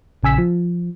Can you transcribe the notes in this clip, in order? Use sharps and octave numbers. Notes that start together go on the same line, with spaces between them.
A#1 C#3 G#5 E6 B6
F3